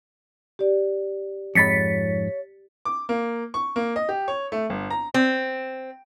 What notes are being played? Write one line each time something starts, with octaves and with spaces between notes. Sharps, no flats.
G4 D5
F2 G#2 C#5 B5 A6 B6 C#7
D6
A#3
C#6
A#3
D#5
G4
C#5
A3
G1
A#5
C4